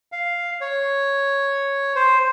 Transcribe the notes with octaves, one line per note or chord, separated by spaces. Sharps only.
F5
C#5
C5